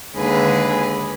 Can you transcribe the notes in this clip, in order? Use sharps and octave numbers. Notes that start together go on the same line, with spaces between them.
D#2 D3 G#3 G#4 B4